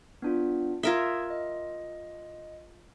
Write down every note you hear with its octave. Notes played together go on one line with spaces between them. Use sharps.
B3 D4 F4
F4 A#4 E5 D#6 G#6
D#5